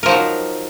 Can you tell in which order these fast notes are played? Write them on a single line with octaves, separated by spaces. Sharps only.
A#4 F3 D#4 F#3